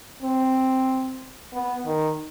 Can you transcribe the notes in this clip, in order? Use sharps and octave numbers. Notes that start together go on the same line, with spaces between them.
C4
B3
D#3